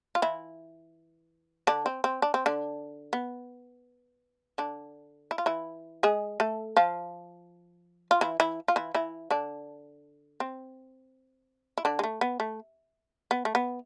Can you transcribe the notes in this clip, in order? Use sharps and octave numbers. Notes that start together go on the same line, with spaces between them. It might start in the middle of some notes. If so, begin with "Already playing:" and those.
F4
E3 E4
D3 D4
C4
C4
D4
C4
D3 D4
B3
D3 D4
E4
F4
E3 E4
G#3 G#4
A3 A4
F3 F4
F4
E3 E4
E3 E4
F4
E3 E4
E3 E4
D3 D4
C4
E4
D3 D4
G#3
A3
B3
A3
B3
A3
B3